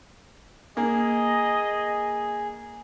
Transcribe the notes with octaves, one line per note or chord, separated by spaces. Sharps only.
A#3 G#4 D#5